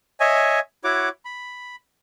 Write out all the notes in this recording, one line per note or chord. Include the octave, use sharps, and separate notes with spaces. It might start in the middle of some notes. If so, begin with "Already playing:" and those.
C#5 D#5 E5 G#5
E4 F#4 C#5 F#5 D6
B5